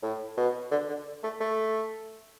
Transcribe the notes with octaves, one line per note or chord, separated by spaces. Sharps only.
A2
B2
D3
D3
A3
A3